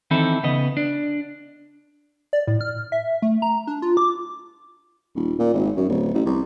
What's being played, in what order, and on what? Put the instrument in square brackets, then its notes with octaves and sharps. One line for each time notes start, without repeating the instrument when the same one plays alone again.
[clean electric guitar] D#3 E3 C4 D#4 E4 A4
C#3 B3 D#5
D4
[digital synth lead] D5
A2
F6
E5
A3
A#5
D4
F4
D6
[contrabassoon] D#1
A#2
G#1
F#2
D1
A1
C2